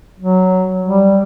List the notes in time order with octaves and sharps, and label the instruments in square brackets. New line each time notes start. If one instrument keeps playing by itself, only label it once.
[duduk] F#3
G3